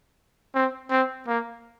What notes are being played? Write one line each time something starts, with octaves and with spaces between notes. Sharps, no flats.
C4
C4
A#3